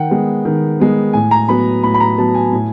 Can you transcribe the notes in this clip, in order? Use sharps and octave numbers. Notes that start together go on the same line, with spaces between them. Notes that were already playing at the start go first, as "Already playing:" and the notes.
Already playing: D#3 F#5 G5
G#3 B3
D#3
G#3 B3
A2 G#5
A#5
F#3 B3 B5
A2 B5
B5
A#5
F#3 B3 A5
G#5
A2